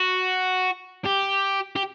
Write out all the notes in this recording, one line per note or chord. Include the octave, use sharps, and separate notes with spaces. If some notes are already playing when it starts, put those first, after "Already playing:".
Already playing: F#4
G4
G4